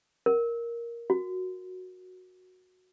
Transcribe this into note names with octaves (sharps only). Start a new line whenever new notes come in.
A#4
F#4